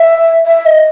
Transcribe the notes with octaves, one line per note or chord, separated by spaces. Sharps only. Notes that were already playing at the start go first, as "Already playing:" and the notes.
Already playing: E5
E5
D#5